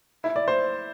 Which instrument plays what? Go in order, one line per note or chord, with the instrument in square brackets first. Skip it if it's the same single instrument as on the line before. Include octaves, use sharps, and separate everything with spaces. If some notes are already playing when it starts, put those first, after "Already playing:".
[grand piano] E4
D5
C5